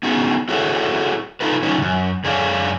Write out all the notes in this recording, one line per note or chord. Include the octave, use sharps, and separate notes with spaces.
B3 C#4 D#4 F#4 G#4
E4 F#4 G#4 A4 C#5 F#5
D#4 F4 A4 B4
F#3 C#4 D#4 F4
F#2 C3
F#2 G#4 C#5 D5 F5